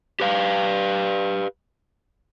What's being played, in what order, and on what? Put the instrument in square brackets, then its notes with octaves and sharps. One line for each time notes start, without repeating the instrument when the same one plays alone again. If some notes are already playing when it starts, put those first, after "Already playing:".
[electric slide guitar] G4 B4 F5